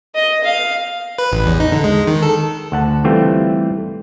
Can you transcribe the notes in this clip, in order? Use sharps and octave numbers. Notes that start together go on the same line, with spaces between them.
D#5
F5
B4
A1
E2
D#4
D3
G#3
D#3
A4
D2 F#5 A5
E3 G3 A3 C4 F4